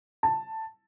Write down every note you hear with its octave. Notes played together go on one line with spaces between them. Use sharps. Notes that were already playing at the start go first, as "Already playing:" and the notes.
A5